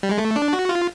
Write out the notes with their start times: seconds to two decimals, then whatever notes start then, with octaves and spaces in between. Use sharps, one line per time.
0.03 G3
0.11 G#3
0.18 A3
0.36 D4
0.53 F#4
0.69 F4